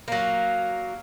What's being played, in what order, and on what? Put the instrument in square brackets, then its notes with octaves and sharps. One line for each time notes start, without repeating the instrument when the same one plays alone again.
[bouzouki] F#3 A#3